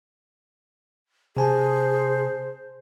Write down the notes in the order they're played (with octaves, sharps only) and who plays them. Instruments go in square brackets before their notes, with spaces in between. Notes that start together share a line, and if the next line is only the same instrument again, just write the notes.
[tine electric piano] C3 G#5 A5 [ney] G#4 [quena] C5